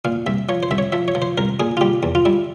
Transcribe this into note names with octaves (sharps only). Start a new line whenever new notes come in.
A#2 F5
C2 E5
F3 C#5
C5
C2 E5
C#5
F3 E5
C#5
F3
C5
C2 A#4
A#2 G#4
F4
G3 G4
E2
F4
G3 E4